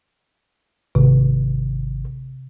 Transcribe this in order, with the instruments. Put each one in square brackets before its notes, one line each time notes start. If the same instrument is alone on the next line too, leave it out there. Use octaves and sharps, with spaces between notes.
[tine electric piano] G#1 [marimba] C3